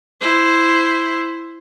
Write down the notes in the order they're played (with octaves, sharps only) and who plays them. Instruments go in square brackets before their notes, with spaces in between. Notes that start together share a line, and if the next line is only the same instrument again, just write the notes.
[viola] E4 C5